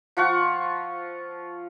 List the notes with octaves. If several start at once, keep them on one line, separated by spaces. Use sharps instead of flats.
F3 F4 F#5 C#6